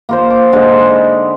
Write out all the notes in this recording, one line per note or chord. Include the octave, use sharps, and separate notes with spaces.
A#3 F4 C5
D6
D3 G#3 D#4
B5